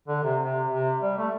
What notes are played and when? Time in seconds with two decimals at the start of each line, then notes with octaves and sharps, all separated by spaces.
0.08 D3
0.24 C3
0.39 C3
0.70 C3
1.02 G3
1.18 A3